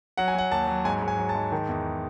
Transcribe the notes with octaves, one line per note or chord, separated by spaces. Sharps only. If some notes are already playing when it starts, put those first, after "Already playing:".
F#3 F#5
G#5
F#3 F#5
D#2 A5
F#3
G#2 G#5
G#2
G#5
F#3
A5
G#2
D#3
E2